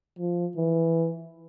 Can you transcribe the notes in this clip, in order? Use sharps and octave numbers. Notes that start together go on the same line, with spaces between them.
F3
E3